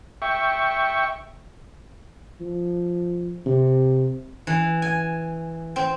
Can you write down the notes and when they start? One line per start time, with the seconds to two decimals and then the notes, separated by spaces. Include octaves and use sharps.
0.22 E5 G5 C#6
2.41 F3
3.46 C3
4.47 E3
4.82 G#5
5.76 C4